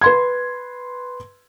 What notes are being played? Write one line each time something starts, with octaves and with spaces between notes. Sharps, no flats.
B4 C6 G#6